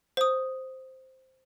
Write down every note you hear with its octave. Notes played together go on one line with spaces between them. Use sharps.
C5 D#6